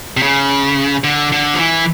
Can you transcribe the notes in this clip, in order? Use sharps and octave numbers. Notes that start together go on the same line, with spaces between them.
C3
C#3
D3
D3
F3
E3